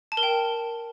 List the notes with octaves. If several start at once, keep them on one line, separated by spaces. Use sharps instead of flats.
A5
A#4
G5